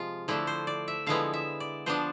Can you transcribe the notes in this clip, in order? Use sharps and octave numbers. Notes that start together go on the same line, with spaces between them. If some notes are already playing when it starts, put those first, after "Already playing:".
Already playing: C3 F3 G#3 F4
D3 F3 A3 D4 E4
C5
D5
E5
D3 F3 G#3 B3 E4 F5
E5
D5
F3 B3 D4 C5